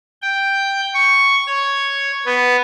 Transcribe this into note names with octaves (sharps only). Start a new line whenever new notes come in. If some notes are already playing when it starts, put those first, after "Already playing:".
G5
C#6
C#5
B3